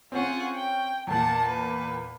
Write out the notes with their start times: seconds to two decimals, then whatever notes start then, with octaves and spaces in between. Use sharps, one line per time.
0.12 C4 C#4 F4 G#4 F#5
0.55 G5
1.07 E2 A#2 F#5 A5
1.45 B4